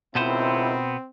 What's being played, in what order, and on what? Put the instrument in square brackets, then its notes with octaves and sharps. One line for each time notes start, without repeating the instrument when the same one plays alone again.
[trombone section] C#2 D#3 E4 [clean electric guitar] B2 B3 C5 [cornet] C4